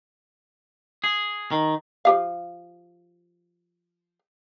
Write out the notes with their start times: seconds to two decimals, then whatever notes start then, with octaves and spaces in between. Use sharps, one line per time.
1.04 G#4
1.51 D#3
2.05 F3 G4 F5